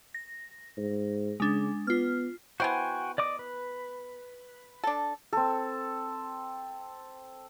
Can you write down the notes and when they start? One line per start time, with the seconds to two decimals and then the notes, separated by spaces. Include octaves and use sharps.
0.15 A#6
0.77 G#2
1.40 C#3 G#3 D4
1.87 B3 F4 F6
2.60 B3 E4 F#4 C5 G5 G#5
3.18 D5 D#5 D6
3.39 B4
4.84 D4 A4
5.33 C4 A4